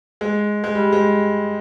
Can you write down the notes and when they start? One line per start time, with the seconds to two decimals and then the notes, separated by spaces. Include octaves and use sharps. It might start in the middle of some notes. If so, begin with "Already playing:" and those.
0.21 G#3
0.64 G#3
0.75 G3
0.92 G#3